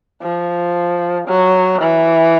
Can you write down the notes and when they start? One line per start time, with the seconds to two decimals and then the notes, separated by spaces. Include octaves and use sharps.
0.22 F3
1.28 F#3
1.81 E3